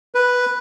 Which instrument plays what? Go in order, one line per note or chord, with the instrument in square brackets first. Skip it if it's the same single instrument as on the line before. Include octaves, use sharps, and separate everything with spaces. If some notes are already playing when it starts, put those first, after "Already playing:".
[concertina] B4